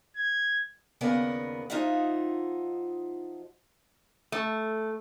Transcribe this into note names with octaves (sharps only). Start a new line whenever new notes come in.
G#6
D#2 C#3 B3 A#4 D5 F#5
F3 D#4 F4 D#5 E5 F#5
A3